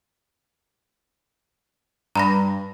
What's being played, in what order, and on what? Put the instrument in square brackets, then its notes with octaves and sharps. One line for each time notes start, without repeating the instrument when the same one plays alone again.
[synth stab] G2 [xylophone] A#5 B5 A#6